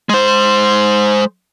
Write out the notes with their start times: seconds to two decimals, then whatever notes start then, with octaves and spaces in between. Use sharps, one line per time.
0.09 G#3 C5